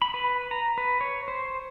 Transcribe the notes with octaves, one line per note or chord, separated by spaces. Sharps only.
B5
B4
A#5
B4
C#5
C5